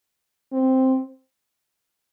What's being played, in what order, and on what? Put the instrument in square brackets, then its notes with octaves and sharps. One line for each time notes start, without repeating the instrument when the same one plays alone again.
[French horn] C4